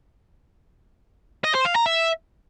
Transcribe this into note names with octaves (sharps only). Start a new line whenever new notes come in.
D#5
C5
F5
A#5
E5